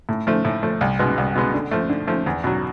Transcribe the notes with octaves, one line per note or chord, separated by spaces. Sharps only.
A2
F3 A3
A2
F3 A3
C2
B2 G#3 B3
C2
B2 G#3 B3
D3
F3 A3
D3
F3 A3
E2
B2 F#3